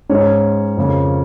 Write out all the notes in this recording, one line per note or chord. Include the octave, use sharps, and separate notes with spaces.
G#2 G#3 C#4 C#5
F2 C#3 A#3 C#4